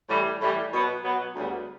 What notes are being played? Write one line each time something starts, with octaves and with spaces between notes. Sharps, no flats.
A2 E3 G3
A2 E3 G3
B2 F#3 B3
B2 F#3 B3
D2 C#3 G3 B3